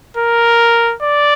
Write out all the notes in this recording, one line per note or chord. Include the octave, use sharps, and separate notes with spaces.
A#4
D5